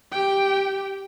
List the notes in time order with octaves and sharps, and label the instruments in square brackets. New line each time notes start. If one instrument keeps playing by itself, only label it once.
[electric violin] G4 G5